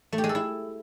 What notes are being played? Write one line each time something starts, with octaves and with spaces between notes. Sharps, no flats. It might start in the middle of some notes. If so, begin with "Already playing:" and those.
A3
G4
G#3
A4
E4